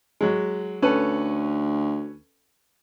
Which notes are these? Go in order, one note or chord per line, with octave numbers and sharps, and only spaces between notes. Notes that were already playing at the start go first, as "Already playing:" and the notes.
F#3 G#3
D2 C#4 A4 B4